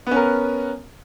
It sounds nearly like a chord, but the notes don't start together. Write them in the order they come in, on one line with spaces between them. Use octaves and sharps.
B3 C#4 A#4